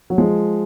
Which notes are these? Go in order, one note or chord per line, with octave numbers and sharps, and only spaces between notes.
F#3
F3 G#3